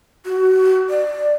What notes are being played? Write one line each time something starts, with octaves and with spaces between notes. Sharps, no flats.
F#4
D5